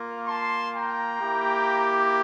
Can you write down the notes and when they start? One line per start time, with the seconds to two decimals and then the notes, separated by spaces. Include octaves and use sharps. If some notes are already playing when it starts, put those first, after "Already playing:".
Already playing: A#3 F4
0.27 A5 C6
0.74 G5 A#5
1.21 A#3 E4 G4